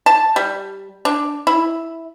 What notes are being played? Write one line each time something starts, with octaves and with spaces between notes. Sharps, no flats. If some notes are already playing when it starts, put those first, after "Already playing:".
A5
G3
D4
E4